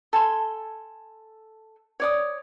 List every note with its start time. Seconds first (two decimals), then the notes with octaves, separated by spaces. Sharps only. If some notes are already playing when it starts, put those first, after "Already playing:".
0.13 A4 G#5 C6
2.00 C#5 D5 D#6